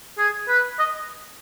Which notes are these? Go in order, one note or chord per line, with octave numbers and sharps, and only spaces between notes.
G#4
B4
D#5